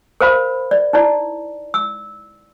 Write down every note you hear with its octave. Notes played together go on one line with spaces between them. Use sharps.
A#4 C5 F5 B5
D5
D#4 E4 D5
E6